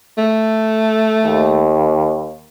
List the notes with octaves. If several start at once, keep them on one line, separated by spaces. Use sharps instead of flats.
A3
D#2